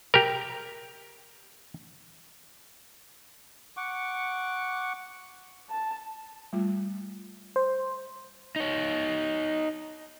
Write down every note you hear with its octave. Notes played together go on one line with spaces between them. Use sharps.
G4 A#4
F#5 C#6 D6
A5
G3 A3 F4
C5
D#4 C#5